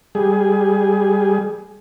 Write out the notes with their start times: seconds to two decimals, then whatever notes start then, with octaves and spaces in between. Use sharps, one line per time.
0.15 G3 G#4